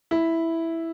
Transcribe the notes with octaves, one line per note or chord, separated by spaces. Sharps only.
E4